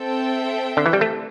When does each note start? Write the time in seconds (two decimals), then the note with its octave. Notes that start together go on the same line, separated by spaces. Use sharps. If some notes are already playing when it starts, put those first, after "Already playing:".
Already playing: C4 A4 E5 G5
0.77 D3
0.86 E3
0.93 G3
1.01 A3